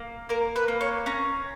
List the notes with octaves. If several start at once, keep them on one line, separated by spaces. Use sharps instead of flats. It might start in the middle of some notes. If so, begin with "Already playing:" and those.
Already playing: A#3
A#3 A#4
B4
A#3
C#5
C#4 A#5